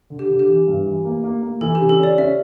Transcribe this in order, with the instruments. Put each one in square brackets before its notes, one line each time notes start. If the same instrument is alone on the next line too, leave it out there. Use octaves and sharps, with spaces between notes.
[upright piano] D3
[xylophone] G4
[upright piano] D3
[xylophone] G4
[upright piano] E3
G2
E3
A#3
A#3
A#3
[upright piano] E3 [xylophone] A4
[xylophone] G4
[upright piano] C#3
[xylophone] A4
[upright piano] C#4 [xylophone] D5
[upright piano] C#4 [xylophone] E5